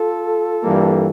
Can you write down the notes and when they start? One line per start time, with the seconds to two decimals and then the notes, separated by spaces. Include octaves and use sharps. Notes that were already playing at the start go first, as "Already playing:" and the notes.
Already playing: F4 A4
0.63 G2 E3 G3 A#3